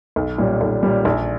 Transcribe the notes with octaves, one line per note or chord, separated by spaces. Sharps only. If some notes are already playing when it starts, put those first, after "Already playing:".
B1
A#2 G3 C#4
B1
A#2 G3 C#4
A#1